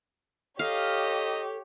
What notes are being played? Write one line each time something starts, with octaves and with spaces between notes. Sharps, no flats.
D#4 G4 A4 C#5 D#5 F5